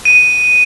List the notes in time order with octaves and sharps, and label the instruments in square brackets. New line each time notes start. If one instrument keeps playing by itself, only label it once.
[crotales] D#7